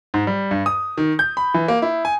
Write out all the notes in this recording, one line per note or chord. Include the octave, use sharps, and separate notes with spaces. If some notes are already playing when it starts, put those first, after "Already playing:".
G#2
G3
G2
D#6
D#3
G6
B5
E3
A#3
E4
G#5